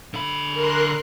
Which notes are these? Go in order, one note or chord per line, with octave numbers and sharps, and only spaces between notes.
D3 B5
A#4 C6 F#6